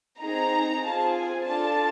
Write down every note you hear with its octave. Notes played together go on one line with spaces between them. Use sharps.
C4 D#4 G#4 A#5
C4 F4 G#4 A5
G#5
D4 F4 A4 A5